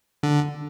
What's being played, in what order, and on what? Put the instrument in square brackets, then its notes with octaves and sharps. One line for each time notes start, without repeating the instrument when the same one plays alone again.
[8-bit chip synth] D3